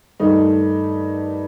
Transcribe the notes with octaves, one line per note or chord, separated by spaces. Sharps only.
G2 D#3 A3 D#4